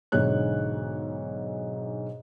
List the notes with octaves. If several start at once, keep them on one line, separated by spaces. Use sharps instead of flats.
B1 G#2 D3 C#5 F#6